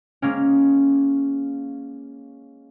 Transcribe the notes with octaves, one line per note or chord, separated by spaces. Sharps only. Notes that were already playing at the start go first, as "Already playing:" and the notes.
G#3 A#3 C#4